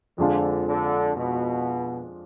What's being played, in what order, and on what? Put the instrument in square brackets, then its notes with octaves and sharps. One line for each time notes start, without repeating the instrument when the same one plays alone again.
[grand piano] F2 F3 G#3 D4 F4 [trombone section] D3
[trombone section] D3
B2